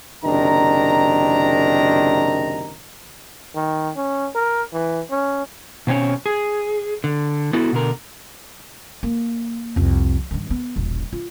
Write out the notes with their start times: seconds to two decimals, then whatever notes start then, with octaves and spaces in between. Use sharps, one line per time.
0.24 F#1 C3 D#3 D4 A#5
3.56 D#3
3.96 C#4
4.35 A#4
4.73 E3
5.11 C#4
5.87 B2 C4 C#4 C#5
6.26 G#4
7.04 D3
7.53 B3 E4 F#4 A4
7.72 B2 D3 A#4
9.03 A#3
9.76 C2 F2
10.31 G2 D#3
10.50 B3
10.76 E1 A#1
11.12 F4